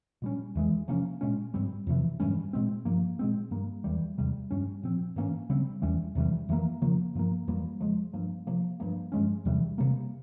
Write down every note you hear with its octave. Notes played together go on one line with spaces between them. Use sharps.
A#2 G3 C#4
E2 E3 G#3
C3 F3 A#3 C#4
A#2 G#3 C#4
G#2 G3 C4
F2 C3 E3
G#2 E3 G3 C#4
A#2 G#3 C4
G2 F3 A#3
A#2 G#3 C4
G2 G3 A#3
E2 E3 G3
E2 C3 G3
G2 G3 C#4
A#2 F3 C4
G#2 E3 A#3 C#4
C#3 G3 C4
E2 E3 G3 C#4
E2 C3 E3 G3
F2 E3 G3 A#3
C#3 F3 A#3
G2 F3 A#3
F2 E3 G3 A#3
C#3 F3 G#3
G2 F3 A#3
C3 F3 A#3
G2 F3 A#3
G2 F3 G#3 C#4
E2 C3 E3 G3
C3 G3 A#3